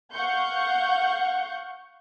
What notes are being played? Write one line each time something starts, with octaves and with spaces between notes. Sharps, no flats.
F5 F#5 C#6 G6